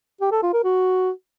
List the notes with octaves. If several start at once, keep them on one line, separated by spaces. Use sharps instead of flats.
G4
A4
F4
A#4
F#4